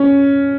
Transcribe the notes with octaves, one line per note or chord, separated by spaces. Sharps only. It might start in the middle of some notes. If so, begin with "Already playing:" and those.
Already playing: C#4